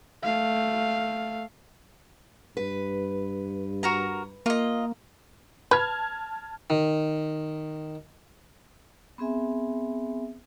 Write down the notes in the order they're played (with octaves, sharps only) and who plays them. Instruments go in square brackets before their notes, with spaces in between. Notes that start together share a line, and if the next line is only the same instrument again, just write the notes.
[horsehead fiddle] A3 F5
[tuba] G2 [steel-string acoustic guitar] B4
[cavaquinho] F#4 A#4 A#5
[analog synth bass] A#3 [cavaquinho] F4 D#5
[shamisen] B4 [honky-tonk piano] A5 F6 G#6
[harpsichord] D#3
[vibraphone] B3 C4 G#4 E5 G#5